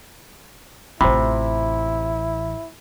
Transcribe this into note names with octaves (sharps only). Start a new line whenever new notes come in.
A1 C3 E4 F4 C5 B5